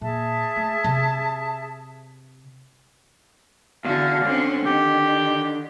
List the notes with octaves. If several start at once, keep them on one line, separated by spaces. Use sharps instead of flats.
A#2 G#4 E5 A5
A3
C3
E2 D3 F#4 F5
D3 C4 C#4
D#3 G4